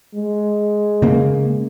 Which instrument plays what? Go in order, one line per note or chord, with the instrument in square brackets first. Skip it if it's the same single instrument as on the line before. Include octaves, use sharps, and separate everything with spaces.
[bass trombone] G#3
[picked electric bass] C#3 A#3